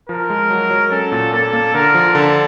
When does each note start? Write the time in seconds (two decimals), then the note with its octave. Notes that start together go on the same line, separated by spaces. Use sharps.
0.09 F3 A#4
0.30 G#3
0.50 F#3
0.71 F#3
0.91 C#4 A4
1.12 A#2
1.33 A#3 A4
1.53 A#3
1.74 D3 A#4
1.94 F3
2.15 D3 A4